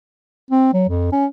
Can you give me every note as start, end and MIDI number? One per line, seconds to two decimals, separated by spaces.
0.51 0.71 60
0.73 0.85 54
0.89 1.07 41
1.12 1.26 61